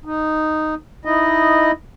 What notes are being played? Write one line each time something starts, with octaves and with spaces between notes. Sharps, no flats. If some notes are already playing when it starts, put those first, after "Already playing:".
D#4
D#4 E4 D#5